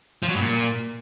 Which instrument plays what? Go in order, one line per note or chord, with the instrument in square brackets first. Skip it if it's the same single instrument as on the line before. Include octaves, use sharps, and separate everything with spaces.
[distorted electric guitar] F3
F#3
G2
A#2